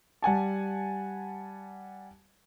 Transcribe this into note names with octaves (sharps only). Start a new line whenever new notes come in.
G3 F#5 G#5 A5